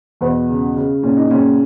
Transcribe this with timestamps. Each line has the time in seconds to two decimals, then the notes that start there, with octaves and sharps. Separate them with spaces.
0.21 E2 B2 B3
0.49 C#3
0.76 C#3
1.03 A#2 C#4
1.17 D#4
1.31 A#2 C#3 C#4